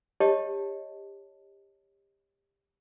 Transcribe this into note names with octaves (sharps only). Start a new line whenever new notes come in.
G4 C#5 D#5 A5